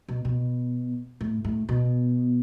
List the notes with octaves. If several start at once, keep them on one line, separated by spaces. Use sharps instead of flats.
B2
B2
A2
A2
B2